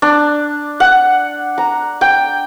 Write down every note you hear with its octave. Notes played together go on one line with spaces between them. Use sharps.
D4
F#5
A#5
G5